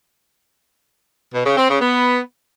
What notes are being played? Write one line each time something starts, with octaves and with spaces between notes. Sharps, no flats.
B2
C#3
C4
C#3
B3